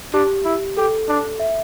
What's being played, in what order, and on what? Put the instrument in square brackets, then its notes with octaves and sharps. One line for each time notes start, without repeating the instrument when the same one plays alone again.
[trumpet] D4 [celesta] G4
[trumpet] E4
[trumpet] G4 [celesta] A4
[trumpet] D4
[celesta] E5